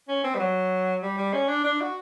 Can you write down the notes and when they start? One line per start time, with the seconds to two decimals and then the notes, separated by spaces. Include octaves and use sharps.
0.08 C#4
0.24 C4
0.35 G3
0.39 F#3
1.02 G3
1.17 G3
1.33 C#4
1.49 D4
1.64 D4
1.81 F#4